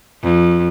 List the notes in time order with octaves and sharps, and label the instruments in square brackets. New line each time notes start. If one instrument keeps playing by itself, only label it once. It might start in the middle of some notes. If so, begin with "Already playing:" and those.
[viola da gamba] F2